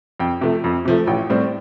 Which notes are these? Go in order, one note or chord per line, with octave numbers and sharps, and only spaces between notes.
F2 G5
C3 F3 A3
F2
C3 F3 A3
A1 G5
A2 G3 C4